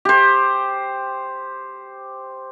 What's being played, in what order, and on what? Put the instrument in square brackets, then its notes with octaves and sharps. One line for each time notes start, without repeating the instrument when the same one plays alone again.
[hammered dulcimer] G4 C5